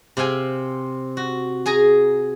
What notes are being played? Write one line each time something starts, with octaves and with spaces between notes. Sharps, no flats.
C3 C4 F5 G#5
F#4
G#4 G#5 A#5